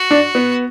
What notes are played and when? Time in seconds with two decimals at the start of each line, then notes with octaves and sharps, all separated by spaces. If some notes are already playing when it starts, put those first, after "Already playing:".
Already playing: F#4
0.11 D4
0.35 B3